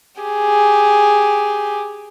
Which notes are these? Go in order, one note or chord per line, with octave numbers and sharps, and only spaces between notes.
G4 G#4